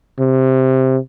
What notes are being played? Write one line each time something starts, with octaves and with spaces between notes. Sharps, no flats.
C3